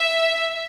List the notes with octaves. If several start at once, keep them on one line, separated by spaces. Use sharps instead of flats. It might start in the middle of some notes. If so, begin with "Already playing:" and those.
Already playing: E5